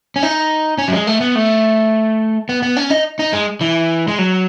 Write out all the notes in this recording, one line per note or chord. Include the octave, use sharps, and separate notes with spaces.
C#4
D#4
C#4
F#3
G#3
A3
B3
A3
B3
B3
C#4
D#4
D#4
G#3
E3
G#3
F#3